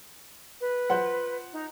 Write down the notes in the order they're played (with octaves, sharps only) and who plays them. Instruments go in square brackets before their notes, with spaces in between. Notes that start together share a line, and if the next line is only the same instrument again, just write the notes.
[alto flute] B4
[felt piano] F4 C5 F#5
[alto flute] D#4